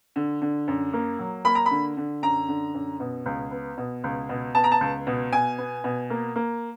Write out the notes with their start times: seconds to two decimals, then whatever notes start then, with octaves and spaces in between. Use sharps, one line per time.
0.16 D3
0.42 D3
0.68 F#2
0.93 A#3
1.19 F#3
1.45 A#3 B5
1.55 A#5
1.66 B5
1.71 D3
1.97 D3
2.22 F#2 A#5
2.48 D3
2.74 F#2
3.00 B2
3.26 C#2
3.51 B3
3.78 B2
4.04 C#2
4.29 B2
4.55 B3 A5
4.64 A#5
4.72 A5
4.81 C#2
5.07 B2
5.32 B2 G#5
5.58 B3
5.84 B2
6.10 A#3
6.36 A#3